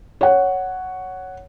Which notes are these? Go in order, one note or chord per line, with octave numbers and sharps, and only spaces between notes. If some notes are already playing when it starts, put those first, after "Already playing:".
C#5 F#5